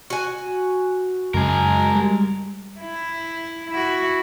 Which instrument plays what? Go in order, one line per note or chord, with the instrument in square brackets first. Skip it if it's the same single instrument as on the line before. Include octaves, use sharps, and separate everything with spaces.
[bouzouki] F#4 G#5
[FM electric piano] F#2 C#3 [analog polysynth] G#3 [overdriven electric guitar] G#4 A#4
[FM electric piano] G3
[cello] E4
E4 F#4